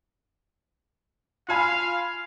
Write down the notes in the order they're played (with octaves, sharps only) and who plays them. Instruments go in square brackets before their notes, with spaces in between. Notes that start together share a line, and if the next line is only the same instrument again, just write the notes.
[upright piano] F4 G#5 B5 [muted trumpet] F5